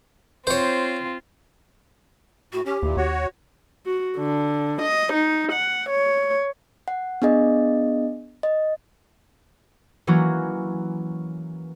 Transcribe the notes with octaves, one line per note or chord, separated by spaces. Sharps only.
C4 F4 C5 C#5
A2 F#4
C#4 G4
D#2 A#2 E3
D#2 F#4 C#5
F#4
D3
D#5
D#4
F#5
C#5
F#5
B3 D4 G#4 D#5
D#5
E3 F#3 A#3 C#4 F#4